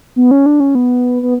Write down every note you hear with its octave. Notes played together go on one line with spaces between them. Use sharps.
B3
C#4
D4
C#4
B3
B3